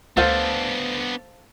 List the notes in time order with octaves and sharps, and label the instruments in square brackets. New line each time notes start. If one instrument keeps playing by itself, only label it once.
[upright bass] D2 [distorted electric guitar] B3 D4 [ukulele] A4 C5 F5